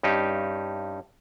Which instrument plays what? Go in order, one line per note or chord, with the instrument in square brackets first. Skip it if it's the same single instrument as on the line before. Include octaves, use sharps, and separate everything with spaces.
[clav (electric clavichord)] G2 C#4 D#4 G4